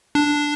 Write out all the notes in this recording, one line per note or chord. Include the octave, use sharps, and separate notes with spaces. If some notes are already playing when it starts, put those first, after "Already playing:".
D4